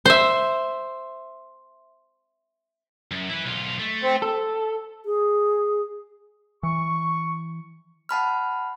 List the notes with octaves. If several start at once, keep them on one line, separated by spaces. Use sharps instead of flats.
C5 E5
F#2
E4 B4
B1 F4
A3
C4
A4
G#4
E3 C#6
F#5 A5 B5 F6